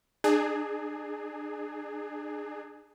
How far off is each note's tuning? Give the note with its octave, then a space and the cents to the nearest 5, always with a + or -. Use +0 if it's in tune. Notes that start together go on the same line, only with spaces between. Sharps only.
D4 +40 G#4 +5